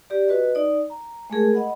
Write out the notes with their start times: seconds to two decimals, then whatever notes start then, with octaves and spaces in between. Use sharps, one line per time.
0.10 G4 D5
0.28 F#4 B4 D#5
0.55 D#4 D5
0.90 A#5
1.30 G#3 A3 G#4 A#4
1.53 D#5 F#5 B5